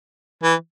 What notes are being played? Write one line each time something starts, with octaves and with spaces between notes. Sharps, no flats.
E3